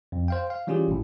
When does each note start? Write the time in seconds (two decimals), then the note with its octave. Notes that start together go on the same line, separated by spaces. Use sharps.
0.12 F2
0.28 C5 F5 G5
0.50 F5
0.67 E3 G3 C#4 F4 G4 G#4
0.88 G#1 A2